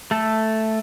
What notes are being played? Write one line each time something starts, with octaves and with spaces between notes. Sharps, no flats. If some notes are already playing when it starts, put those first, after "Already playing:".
A3 A4